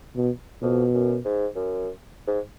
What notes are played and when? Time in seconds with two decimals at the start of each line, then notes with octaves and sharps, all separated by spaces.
0.16 B2
0.62 F2 B2
0.94 F#2
1.25 G#2
1.56 F#2
2.28 G#2